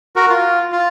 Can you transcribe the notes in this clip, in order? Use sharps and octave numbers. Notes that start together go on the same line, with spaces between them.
F#4 A#4
F4
F4